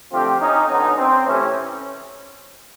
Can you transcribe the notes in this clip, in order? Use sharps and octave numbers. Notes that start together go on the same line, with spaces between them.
D3 F3 A3 C4 F4 G4
C#4 D#4
D3 F#3 B3 C#4 D#4
C4
C3 E3 A3 C#4